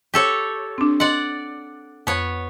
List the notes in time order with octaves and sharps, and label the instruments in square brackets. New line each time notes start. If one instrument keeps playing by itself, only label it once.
[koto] G4 A4 C#5
[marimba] C4 D4
[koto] D5 F#5 [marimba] D#5 C6
[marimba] F2 [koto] B3 C#5